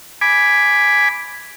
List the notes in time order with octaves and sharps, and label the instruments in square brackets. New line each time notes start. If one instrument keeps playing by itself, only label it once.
[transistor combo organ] G#5 B5 D6